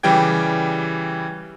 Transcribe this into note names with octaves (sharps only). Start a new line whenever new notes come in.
C#3 E3 G3 G4 G5 G#6